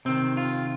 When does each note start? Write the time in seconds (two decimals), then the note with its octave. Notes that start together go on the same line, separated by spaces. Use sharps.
0.05 C3 D#3 C4
0.37 F4